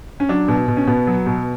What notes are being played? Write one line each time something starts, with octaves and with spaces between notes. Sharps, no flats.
C#4
F#3 D4
B2
B2
C#4
B2 B3
F#3
B2